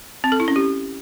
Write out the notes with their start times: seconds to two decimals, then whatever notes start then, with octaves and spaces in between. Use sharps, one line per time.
0.24 C4
0.32 A4
0.40 E4
0.48 C#4
0.56 G4